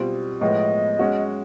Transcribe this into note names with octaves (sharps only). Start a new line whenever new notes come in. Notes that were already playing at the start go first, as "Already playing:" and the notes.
Already playing: B2 G3 C4 F4
A2 F3 G#3 B3 D#5
G#3 C#4 F#4